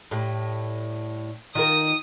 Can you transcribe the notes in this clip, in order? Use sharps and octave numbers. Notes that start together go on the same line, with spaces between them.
A2 G3
D#3 F4 A#4 D#6